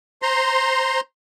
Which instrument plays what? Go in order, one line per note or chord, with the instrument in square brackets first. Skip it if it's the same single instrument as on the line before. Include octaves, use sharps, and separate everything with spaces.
[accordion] C5 A#5 C6